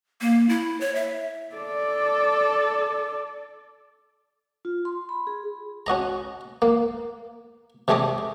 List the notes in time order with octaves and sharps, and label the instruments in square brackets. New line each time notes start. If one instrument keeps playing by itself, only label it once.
[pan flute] A#3
E4
C#5
E5
[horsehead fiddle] A4 D5
[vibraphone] F4
C6
B5
G#4
[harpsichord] C#4 F#4 D#5 A#5
A#3
C3 G3 A3 G#4 D#5 D6